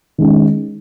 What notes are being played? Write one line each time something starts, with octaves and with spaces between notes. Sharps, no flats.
D#3 G#3 C#4